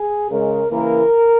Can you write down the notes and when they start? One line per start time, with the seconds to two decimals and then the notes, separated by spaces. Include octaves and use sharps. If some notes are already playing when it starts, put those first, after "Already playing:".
Already playing: G#4
0.30 C#3 G#3 A#4
0.70 C#3 E3 A#3 A#4